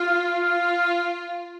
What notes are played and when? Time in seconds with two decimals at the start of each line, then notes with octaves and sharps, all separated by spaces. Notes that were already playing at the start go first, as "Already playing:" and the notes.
Already playing: F4 F5
0.46 F4